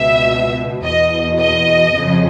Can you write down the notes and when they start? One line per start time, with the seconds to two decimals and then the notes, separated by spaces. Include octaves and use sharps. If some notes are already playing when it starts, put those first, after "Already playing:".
Already playing: C#2 B2 E5
0.84 E2 B2 D#5
1.39 D#5
1.95 F2 C#3 F3